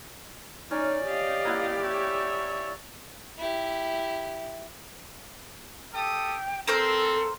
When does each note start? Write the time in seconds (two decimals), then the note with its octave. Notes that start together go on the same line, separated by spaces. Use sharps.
0.71 C#4 D#4 D5
1.05 G4 D#5 F5
1.45 A#3 E4 F#5
1.80 C#5 E5
3.38 E4 G4
5.94 G4 A4 G5 D#6
6.67 C4 A4 A#4 C5 C6